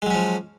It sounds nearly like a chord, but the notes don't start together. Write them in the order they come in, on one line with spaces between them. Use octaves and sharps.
G#3 F#3 C#4 F3